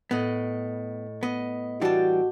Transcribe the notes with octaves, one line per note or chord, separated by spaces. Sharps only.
A2 B3 D#5
B3 D#5
E3 G3 D4 F#4 G4 A5